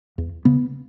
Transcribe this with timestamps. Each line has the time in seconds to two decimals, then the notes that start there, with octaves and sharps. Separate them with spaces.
0.18 E2
0.45 C#3 B3